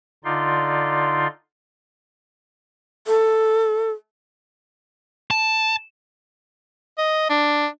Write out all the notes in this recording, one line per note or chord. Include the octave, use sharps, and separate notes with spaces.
D3 D#4 F4 D5 C6
A4
A5
D#5
D4